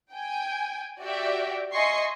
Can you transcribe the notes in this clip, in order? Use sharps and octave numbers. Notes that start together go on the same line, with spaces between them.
G5 G#5
F#4 G4 D5 E5 G5
D#5 E5 G#5 C6 C#6 C7